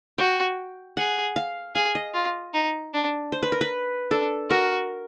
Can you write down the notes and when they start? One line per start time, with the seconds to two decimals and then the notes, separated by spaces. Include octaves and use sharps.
0.18 F#4 G5
0.97 G#4 F#5
1.36 F5
1.75 G#4 F5
1.95 D#5
2.14 F4
2.54 D#4
2.94 D4
3.32 C5
3.43 B4
3.52 A#4
3.61 B4
4.11 D4 A4
4.50 F#4 A#4